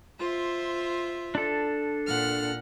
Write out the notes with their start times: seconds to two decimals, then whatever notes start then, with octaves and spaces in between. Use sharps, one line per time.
0.19 F4 C5 E5
1.35 D4 A4
2.06 A#2 F#5 F6